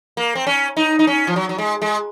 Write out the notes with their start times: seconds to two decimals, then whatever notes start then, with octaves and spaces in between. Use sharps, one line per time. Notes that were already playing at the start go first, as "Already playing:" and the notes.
0.17 A#3
0.35 C4
0.47 C#4
0.77 D#4
0.99 D#4
1.07 C#4
1.27 F3
1.36 F#3
1.49 F#3
1.58 G#3
1.82 G#3